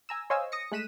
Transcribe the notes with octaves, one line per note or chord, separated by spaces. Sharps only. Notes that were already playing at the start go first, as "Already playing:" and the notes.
G#5 A#5 E6
C5 C#5 D#5 F5 G#5 E6
D#6 A#6 C#7
G#3 A3 F#6 B6 D#7 E7